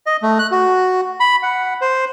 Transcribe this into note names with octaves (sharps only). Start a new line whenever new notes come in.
D#5
A3
F#6
F#4
B5
F#5
C5